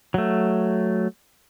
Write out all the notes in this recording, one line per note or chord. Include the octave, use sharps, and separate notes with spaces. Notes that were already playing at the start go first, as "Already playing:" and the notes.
F#3 A3